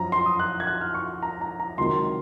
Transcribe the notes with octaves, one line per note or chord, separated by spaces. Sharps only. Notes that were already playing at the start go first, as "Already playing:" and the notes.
Already playing: F#2 F3 A#5
C6
D#6
F#6
G#6
F#6
F6
C#6
A#5
A#5
A#5
C#2 C3 D#3 F#3 C6
C6